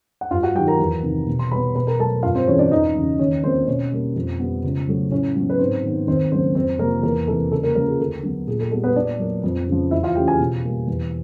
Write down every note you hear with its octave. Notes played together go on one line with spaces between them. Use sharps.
F#5
G2 F4 F5
F#4 F#5
D#3 F#3 G4 G5
A#4 A#5
E2
C3 D#3
B2
C6
G3 B3 B4 B5
B2 B4 B5
A#4 A#5
F#3 A3 A4 A5
G2 F4 F5
C4 C5
E3 G#3 C#4 C#5
D4 D5
E2 D#4 D#5
C#3 E3
D#2 C#4 C#5
D3 F3 A#3 C4 C5
B2 C#4 C#5
G3 A#3
F2
D3 G3 B3
C#2
C#3 F#3 A3
A2 C#4 C#5
F#3 B3
B4
G#2 C4 C5
D#3 G#3 B3
D#2 C4 C5
C#3 F#3 A#3 C4 C5
F2 C4 C5
C3 F3 A#3 A#4
E2 A#3 A#4
C3 E3 A4
C#2 A4
A#3 A#4
C#3 F3 A#3 A#4
G#4
D2 A4
D3 F#3 B3
A#2 G#4
A4
G3 B3 A4
B3 B4
A#2 D4 D5
F#3 A#3
F2
C#3 F3
E2 E4 E5
F4 F5
C#3 E3 A3 G4 G5
G#4 G#5
B2
G3 A#3
E2